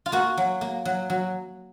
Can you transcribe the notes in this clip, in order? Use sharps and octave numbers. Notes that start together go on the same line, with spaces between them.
F4
A#3 F#4
F#3
A#3
F#3
F#3